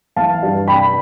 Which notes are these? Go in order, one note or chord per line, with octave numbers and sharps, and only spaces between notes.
E3 F5 A5
G2
C3 G5 B5